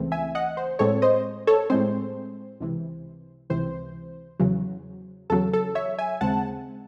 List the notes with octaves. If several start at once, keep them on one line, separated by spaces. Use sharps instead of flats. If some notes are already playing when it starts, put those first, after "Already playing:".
Already playing: C#2 C#3 E3 A3 C4
E5 G#5
D#5 F#5
C5
A2 G#3 C4 A4 C#5
C5 D#5
A4 C#5
A2 G#3 C4 C5
C#2 C3 E3
C#2 C3 E3 C5
E2 C#3 F#3
E2 C#3 F#3 A4
A4
C#5 E5
E5 G#5
D#2 C#3 G#3 C4 F#5 A5